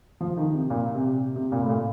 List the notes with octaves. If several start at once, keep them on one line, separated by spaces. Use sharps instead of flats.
F3
D#3
C3
A#2
C3
C3
A#2
A2
A#2